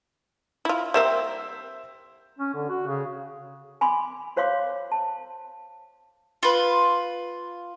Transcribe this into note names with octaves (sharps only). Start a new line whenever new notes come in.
E4 F4
G3 A#3 C4 C5 E5 E7
C#4
D3
F#4
C#3
G#5 B5 C6 D6
F#4 C5 C#5 F5 C6 D6
A5
F4 B4